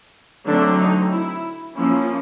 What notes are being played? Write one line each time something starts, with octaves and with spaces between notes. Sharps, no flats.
D3 F#3 A3 C4 D4
D#4
E4
F3 A#3 C#4 E4